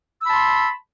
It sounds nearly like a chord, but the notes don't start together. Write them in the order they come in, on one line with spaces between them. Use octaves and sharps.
E6 B5 A5 C6